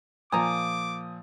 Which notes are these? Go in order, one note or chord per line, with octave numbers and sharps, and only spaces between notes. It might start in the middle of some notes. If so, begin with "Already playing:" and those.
A#2 F3 G#5 A#5 D6 D#6